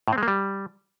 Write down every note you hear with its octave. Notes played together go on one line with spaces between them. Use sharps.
A2
C4
G#3
A#3
G3